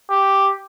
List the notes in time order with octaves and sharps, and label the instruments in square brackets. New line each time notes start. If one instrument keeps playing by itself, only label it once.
[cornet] G4